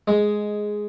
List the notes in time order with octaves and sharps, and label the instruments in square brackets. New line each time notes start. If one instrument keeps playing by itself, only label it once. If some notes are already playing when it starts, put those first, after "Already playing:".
[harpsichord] G#3